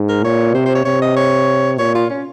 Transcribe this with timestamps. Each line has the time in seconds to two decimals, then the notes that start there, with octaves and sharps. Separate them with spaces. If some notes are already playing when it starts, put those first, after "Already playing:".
Already playing: G#2
0.09 A#4
0.24 A#2 C#5
0.55 C3 C5
0.66 C5
0.75 C#5
0.85 C3 C#5
1.02 D#5
1.16 C#5
1.78 A#2 C#5
1.95 F4
2.10 C#4